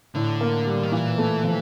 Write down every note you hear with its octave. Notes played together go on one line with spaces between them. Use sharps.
A2 D3
A#3
G3
D#3
A#2 E3
A3
F3